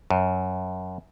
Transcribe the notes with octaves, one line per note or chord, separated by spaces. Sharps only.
F#2